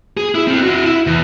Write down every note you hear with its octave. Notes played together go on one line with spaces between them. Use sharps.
G#4
E4
C4 F4
E4 F#4
E4
E2